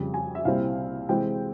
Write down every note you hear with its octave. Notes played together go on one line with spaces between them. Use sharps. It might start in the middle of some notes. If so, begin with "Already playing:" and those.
Already playing: F2 C#3 G3
G#5
E5
C2 A#2 G3 C4 E4 F5
C3 E3 G#3 C4 G5